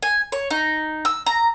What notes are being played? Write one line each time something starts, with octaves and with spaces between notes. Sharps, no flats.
G#5
C#5
D#4
E6
A#5